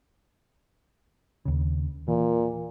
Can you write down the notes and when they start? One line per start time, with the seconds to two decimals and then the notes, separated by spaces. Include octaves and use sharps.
1.45 D#2 C#3
2.08 A#2 E3